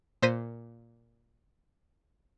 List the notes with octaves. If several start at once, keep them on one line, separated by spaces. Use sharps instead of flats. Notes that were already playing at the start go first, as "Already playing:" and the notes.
A#2 C5 A#6 B6 D#7